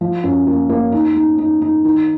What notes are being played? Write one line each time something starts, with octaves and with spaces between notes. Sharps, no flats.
F3
F#2
A#3
A#3
D#4
D#4
D#4
D#4
D#3